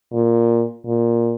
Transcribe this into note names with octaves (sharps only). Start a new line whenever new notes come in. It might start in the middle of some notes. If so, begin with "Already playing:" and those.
A#2
A#2